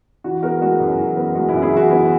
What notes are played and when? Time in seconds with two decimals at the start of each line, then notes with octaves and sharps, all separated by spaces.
0.24 E3 F#4
0.42 B3 F#4 A#4
0.61 G#3 F#4
0.80 F#2
0.98 E3
1.17 B3
1.35 G#3 F#4
1.49 E4
1.53 F#2
1.62 E4 G#4
1.72 E3 F#4
1.90 B3 E4